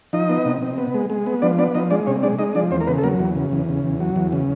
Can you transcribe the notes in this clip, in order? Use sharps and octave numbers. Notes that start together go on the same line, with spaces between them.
F3 D#4 D#5
B3
C3
C3
B3
G#3
G#3
B3
F3 D4 D5
B3 D4 D5
F3 D#4 D#5
G#3 D4 D5
C3 C#4 C#5
G#3 D4 D5
G#3 D#4 D#5
F3 D4 D5
E2 C4 C5
A#4
C#3 B3 B4
A4
F#3 A#3 A#4
E2
C#3
E2
C#3
E2
F#3
E2
C#3